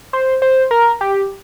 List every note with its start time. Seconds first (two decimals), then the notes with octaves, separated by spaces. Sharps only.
0.13 C5
0.42 C5
0.71 A#4
1.01 G4